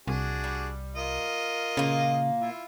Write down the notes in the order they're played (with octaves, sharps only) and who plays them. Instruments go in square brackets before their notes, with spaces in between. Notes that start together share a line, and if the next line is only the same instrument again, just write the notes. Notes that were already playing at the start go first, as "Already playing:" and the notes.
[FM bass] C2 [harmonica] D4 F#4 G#4
[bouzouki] G3
[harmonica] F4 A#4 D#5
[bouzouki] A#2 A#3 [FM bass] C#3
[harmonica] E4 F4